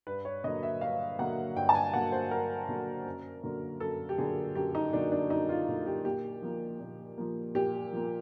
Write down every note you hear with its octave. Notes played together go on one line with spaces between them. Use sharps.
G2 B4
C#5
D3 F#3 A#3 D#5
E5
G2 F5
D3 F#3 A#3 F#5
G2 G5
A5
G#5
D3 F#3 A#3 F#5
C5
G2 A#4
D3 F#3 A#3
F#2
D3 F#3 A#3
F#2 A4
G4
D3 F#3 A#3 G#4
F#2 G4
D#4
D3 F#3 A#3 D4
D4
F#2 D#4
F4
D3 F#3 A#3
G4
A#2 G4
F3 A#3
A#2
F3 A#3
A#2 G4
F3 A#3